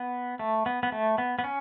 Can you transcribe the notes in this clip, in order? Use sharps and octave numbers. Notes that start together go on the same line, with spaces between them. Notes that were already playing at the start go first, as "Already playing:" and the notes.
Already playing: B3
A3
B3
B3
A3
B3
B3
C#4